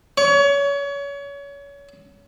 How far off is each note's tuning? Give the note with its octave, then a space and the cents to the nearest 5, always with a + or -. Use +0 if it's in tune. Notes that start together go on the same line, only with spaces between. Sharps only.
C#5 +30